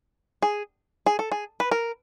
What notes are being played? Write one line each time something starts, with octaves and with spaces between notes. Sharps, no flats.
G#4
G#4
A4
G#4
B4
A#4